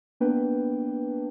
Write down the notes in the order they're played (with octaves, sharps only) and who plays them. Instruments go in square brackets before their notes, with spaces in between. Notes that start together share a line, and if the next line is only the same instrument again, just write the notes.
[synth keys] A#3 B3 D4 B4 G5